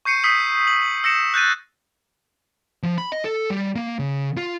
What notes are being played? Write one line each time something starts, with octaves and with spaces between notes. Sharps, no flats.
C#6 G6 C7 C#7 D#7
D#6 E6 G6 B6 C7
F#7
E6 A#6 C#7 E7
F#6 G6 A6 D#7
F3
B5
D#5
A4
G3
A#3
C#3
F4